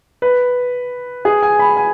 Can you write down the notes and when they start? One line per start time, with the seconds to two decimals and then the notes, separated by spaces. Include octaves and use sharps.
0.22 B4
1.25 G#4
1.43 G#5
1.59 B5
1.77 G#5